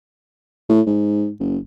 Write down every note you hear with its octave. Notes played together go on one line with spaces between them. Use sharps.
A2
G#2
F#1